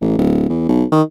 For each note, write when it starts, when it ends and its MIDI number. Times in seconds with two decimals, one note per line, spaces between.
0.01 0.14 33
0.18 0.48 26
0.49 0.66 40
0.69 0.84 35
0.92 1.02 51